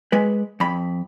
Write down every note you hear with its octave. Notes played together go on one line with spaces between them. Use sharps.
G#3 B4
F2 B5